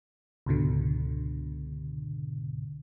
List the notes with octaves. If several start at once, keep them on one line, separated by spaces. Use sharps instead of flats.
C#2 G#2 B2 D3